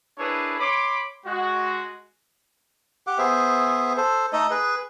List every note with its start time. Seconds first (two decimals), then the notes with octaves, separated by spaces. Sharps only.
0.18 D4 E4 G#4 A#4 B4 C#5
0.59 C#5 B5 C6 D6
1.26 G#3 F#4
3.07 G4 F#5 D6
3.18 B3 G#4 C5 E5
3.97 A4 C5
4.33 A3 D#4 A4 D#5
4.50 G#4 B4